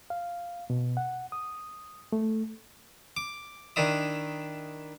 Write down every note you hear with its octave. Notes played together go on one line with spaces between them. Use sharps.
F5
B2
F#5
D#6
A3
D6
D#3 D4 E4 D#6